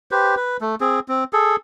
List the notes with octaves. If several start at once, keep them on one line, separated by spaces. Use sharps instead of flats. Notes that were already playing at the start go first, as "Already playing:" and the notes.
G4 B4 C5
B4
A3
C4 G#4
C4
G#4 A4